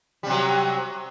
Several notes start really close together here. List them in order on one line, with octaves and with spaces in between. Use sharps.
G3 C3 F#3